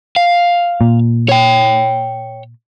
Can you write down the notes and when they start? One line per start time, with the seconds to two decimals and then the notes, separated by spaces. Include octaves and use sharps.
0.16 F5
0.81 A#2
1.29 C#5 G5